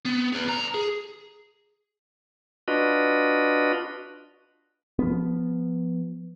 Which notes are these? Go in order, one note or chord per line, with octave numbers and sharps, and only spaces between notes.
B3
G#4 B4
D3 A#5
G#4
D4 F4 F#4 B4 D#5
F3 B3